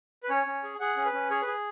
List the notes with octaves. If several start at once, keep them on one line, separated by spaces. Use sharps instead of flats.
B4
C#4 C#5
C#4
G#4
G#4 F#5
C#4
B4
C#4
G#4 C#5
B4
G#4